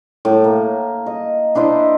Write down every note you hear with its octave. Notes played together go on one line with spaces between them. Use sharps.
A2
A#3
D#5
D4 E4 C5 D#5